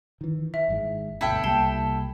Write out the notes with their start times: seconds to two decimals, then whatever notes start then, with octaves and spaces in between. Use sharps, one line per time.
0.21 D#3 E3
0.54 E3 E5
0.68 G#1 G#2 G#3
1.21 G1 D2 B2 E4 A4 G5
1.44 C2 G3 A#3 A5 C7 G7